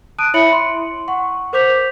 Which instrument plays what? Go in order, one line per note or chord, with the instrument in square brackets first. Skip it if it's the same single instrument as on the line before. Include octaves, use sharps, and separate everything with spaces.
[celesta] A5 D#6 F#6 D7 D#7
E4 C#5 E5 B5 C#7 F#7
C6
F#5 C#6
A#4 C5 D6 G6 B6 F7